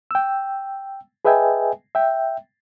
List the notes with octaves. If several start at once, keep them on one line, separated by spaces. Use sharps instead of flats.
G5 E6
G#4 B4 D#5 E5 G5 G#5
E5 G5